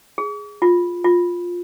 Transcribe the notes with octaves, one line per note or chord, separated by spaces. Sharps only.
G#4
F4
F4